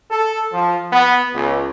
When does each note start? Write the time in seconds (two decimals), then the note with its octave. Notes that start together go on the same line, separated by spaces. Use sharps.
0.10 A4
0.53 F3
0.91 B3
1.33 C#2